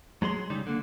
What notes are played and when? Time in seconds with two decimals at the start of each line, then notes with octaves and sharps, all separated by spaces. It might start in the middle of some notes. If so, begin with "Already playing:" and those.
0.22 F#3 G#3 G#4 C6
0.50 C#3 G3 D#4
0.67 D3 A#3